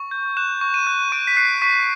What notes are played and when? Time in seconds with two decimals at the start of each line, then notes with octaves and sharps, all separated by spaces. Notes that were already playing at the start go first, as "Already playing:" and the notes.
Already playing: C#6
0.11 G6
0.37 F#6 E7
0.61 C#6
0.74 D#7
0.87 F#6
1.12 C#6 D7
1.27 B6
1.37 F#6 C7
1.62 C#6 B6